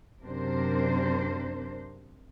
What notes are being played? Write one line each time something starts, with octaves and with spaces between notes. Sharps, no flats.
F#2 C3 D4 A#4 C5